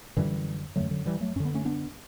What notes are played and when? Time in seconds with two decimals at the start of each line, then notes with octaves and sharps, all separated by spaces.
0.17 F#2 D3 E3 G3
0.76 F#2 D3 F#3 A3
0.91 D3 F#3
1.06 E3 G3
1.21 F#3 A3
1.36 F#2 C#4
1.40 D3 B3
1.54 A3 C#4
1.65 B3 D4